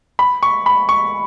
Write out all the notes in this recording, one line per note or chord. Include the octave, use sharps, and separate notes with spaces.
B5
C#6
B5
C#6